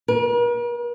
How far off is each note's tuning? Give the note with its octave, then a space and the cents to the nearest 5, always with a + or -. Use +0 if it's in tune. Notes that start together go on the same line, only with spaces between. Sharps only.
A#4 +45